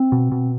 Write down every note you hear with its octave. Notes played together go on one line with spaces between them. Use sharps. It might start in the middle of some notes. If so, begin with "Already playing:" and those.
Already playing: C4
B2
B2